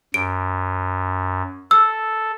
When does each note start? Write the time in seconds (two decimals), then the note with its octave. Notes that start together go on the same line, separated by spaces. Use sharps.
0.14 F#2 D7
1.71 A4 E6